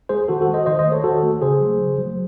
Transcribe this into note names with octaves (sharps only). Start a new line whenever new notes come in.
G#3 G#4 C5
D#3 F#4 A4
F#4 A4
G#3
C5 D#5
D#3 C5 D#5
C5 D#5
A3
A4 C#5
D#3 F#4 A4
A3
C#3 G#4 C5
F#3 A3
C#3
F#3 A3